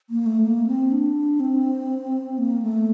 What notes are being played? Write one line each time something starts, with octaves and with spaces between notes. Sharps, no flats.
A#3
A3
A#3
C4
D4
C4
A#3
A3